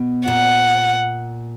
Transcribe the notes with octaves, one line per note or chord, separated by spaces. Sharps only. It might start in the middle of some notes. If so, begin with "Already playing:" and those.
Already playing: B2
A#2 F#5